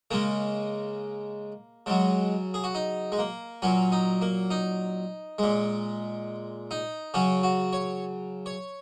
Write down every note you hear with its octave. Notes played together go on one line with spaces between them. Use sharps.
C#3 G#3 A#3
C#3 F#3 G#3
G#4
F#4
D#4
G#3
A#3
A#2 F#3 C#4
D#4
A#3
D#4
A#2 G#3
D#4
C#3 F#3 C#4
F#4
C#5
C#5